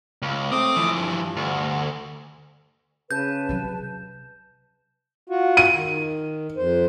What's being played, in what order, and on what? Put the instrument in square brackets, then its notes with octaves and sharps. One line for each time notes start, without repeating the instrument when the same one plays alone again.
[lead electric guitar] C#2
[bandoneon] A3 D6 D#6 [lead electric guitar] C4
[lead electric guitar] E3 F3
[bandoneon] G2
[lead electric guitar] D2
[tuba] C#3 [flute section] B4 A5 [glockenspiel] G6
[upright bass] C3 F#3
[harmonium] F4 F#4
[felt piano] D#7
[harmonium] D#3
F2 C5